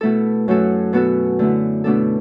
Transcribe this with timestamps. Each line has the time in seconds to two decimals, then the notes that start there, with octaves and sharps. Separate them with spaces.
0.01 B2 A3 E4 A4
0.48 F#2 F#3 A3 F#4 A4
0.93 B2 B3 F#4 A4
1.39 D3 A3 E4
1.84 B2 A3 D4 A4